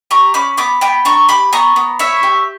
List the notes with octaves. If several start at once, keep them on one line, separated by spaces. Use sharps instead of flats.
G4 A#5 C#6
C#4 B5 D6
B3 B5 D6
B3 G5 B5
D4 A#5 C#6
G4 B5 D6
B3 A#5 C#6
B3
E4 C#5 E5
G4